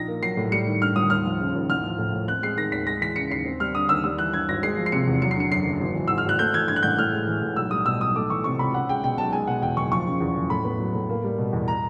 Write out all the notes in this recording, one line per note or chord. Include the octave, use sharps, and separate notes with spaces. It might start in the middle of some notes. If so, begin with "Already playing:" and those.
Already playing: A#1 D#4 A#6
A#3
F#3 C7
A2
G3 C#7
D#3
G2 F6
G1 D#6
D#2 F6
F3
C#3
D#2
A1 F6
F3
A2
A1
C4 F#6
G#3 C7
D#3 A#6
D#2 B6
G#3 A#6
E3 B6
C#3 C#7
D#2 C7
C4
G3 F6
D3 D#6
D#2 E6
G3 E6
E3 F#6
G2 G#6
G#1 A#6
G#3 C7
F3
C7
C3 C#7
E2
F#3 C#7
C7
D3 C#7
F#2 C7
F#1
G#1
E3
G#2 E6
F6
G#1 F#6
A3 G6
E3 G#6
G2 G#6
F#6
A1 G6
A2 F6
G#3
E3
A2
B1 E6
G3 D#6
B2 E6
B1 D#6
A3 D6
E3 C#6
C3 C#6
C#2 B5
C#4 F#5
G#3 G5
B2 G5
B1 A5
G#3 G#5
B2 F#5
E2 G5
F#1 C#6
F3 C#6
C#3
E2
F#1
A2 B5
B3
F#3
A2
A#3
G3
B2
E2
A#5